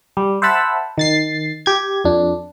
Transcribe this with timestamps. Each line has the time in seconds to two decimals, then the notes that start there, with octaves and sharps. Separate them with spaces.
0.17 G3
0.42 C5 E5 F#5 A5 B5 E6
0.98 D#3 A6 C7
1.66 G4 G#6
2.04 F2 D4